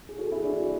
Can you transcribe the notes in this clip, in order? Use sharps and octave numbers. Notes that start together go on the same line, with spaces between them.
G#4
F#4 A4
E4 G#4
D4 F#4
F#4